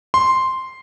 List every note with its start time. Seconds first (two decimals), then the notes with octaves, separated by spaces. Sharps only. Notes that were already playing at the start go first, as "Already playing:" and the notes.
0.14 C6